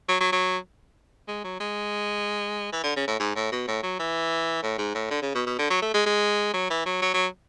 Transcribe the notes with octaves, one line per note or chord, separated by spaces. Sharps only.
F#3
F#3
F#3
G#3
F#3
G#3
E3
D3
C#3
A2
G#2
A2
B2
A2
F#3
E3
A2
G#2
A2
D3
C#3
B2
B2
D3
F#3
A3
G#3
G#3
F#3
E3
F#3
F#3
F#3